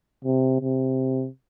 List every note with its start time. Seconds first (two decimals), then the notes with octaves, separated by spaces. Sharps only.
0.25 C3
0.61 C3